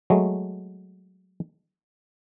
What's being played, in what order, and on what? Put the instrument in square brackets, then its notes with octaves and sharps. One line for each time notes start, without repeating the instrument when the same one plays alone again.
[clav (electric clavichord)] F#3 G#3 A3